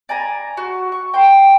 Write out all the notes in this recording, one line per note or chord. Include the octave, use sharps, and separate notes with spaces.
D5 G#5 A#5
F#4
C#6
G5 C6